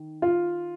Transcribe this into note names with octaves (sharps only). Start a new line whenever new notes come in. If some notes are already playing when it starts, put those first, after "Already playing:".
Already playing: D#3
F4